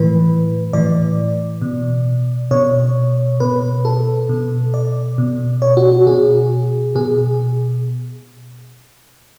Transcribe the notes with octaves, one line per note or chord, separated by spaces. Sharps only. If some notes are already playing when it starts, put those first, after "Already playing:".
Already playing: A2 E3 B4
A2 E3 D5
B2
B2 C#5
B2 B4
A4
B2
D5
B2
C#5
F#4
F#4
B2 G#4
B2 G#4